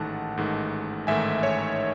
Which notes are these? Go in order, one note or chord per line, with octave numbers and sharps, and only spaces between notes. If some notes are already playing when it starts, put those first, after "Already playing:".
Already playing: A1 G#2 D#3 A3 F#5 A5
A1 G#2 D#3 A3
A1 G#2 D#3 A3 E5 G#5
C#5